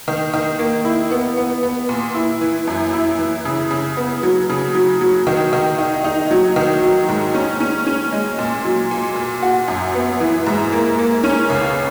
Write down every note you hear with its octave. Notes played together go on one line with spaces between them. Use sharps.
D#3
D#3
A#3
E4
B3
B3
B3
A#2
E4
E3
F#2
E4
E3
C#3
C#3
B3
F#3
C#3
F#3
F#3
D#3
D#3
D#4
D#4
F#3
D#3
F#3
G#2
C#4
C#4
C#4
G#3
A#2
F#3
A#2
A#2
F#4
F#2
B3
E3
G#2
A#3
A#3
C#4
C#2